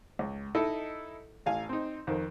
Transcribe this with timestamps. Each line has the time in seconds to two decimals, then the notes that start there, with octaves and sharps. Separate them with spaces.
0.19 C#2
0.55 D#4 E4 A4 D#5
1.46 A1 F5 G#5
1.69 C4 D#4
2.07 F2 D#3